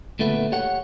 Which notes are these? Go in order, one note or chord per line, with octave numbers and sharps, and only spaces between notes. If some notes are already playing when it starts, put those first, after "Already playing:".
A#2 D3 A3 B3
G4 C#5 F#5